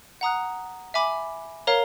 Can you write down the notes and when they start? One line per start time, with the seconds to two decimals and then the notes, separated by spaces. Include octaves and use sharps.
0.21 F#5 A#5 D#6 F#6
0.94 E5 G#5 B5 D6
1.67 A#4 C#5 F5 A#5